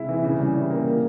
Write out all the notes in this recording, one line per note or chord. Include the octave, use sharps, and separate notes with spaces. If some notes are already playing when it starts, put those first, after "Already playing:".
Already playing: C3 G#3 E4
E3
C#3
G3
E3
A#3
A#3